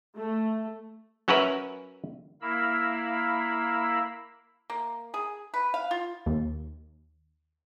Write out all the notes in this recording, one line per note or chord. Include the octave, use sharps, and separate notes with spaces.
A3
F#3 C#4 F#4 A#4 B4 E5
A#3 E4 A#4 F5 B5 E6
A#3
G#4
B4
F5
F4
D#2